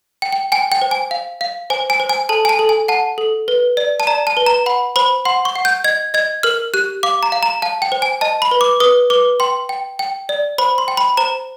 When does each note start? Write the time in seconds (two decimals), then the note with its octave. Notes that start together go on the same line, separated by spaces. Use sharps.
0.22 G5
0.32 G5
0.52 G5 G#5
0.72 G5
0.82 C5
0.91 G#5
1.11 F5
1.41 F5
1.70 C5 G#5
1.90 G#5
2.00 C5
2.09 G#5
2.29 A4 A5
2.45 G#5
2.49 A5
2.59 A4
2.69 G#5
2.88 F#5 A5
3.18 A4
3.48 B4
3.77 D5
4.00 A5
4.07 D5 A#5
4.27 A5
4.37 B4
4.46 A#5
4.66 F#5 B5
4.96 C5 B5
5.25 F#5 C6
5.45 C#6
5.56 F#5
5.65 G6
5.84 D#5 G#6
6.14 D#5 G#6
6.43 A#4 F6
6.74 G4 F#6
7.03 F5 D6
7.23 A#5
7.32 F5
7.43 A#5
7.62 F5 A5
7.82 G5
7.92 C5
8.02 G#5
8.21 D#5 A5
8.42 B5
8.51 B4
8.61 D6
8.80 B4 D#6
9.10 B4 D6
9.40 G5 C6
9.69 G5
9.99 G5
10.29 D5
10.58 C5 B5
10.78 C6
10.88 G5
10.97 B5
11.17 C5 A#5